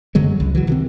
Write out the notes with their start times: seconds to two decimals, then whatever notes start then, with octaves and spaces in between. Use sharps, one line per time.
0.15 F#2 D3 F#3 G#3
0.40 C#2
0.55 E3 F#3
0.67 C3 D#3 C4